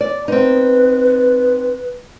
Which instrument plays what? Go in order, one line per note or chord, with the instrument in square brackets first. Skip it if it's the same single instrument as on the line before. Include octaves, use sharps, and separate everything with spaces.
[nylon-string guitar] D5
[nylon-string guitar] C4 D#4 [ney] B4